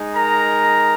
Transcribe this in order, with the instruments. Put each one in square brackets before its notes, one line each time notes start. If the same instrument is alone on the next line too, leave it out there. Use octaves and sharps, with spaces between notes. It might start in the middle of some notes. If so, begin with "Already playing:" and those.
Already playing: [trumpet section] G#3 D#4
A#4 A#5